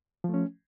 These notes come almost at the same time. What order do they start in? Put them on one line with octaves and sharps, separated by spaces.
F3 A3 C#4